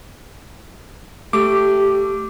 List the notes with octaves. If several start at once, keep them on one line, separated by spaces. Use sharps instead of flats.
A3 G4 D6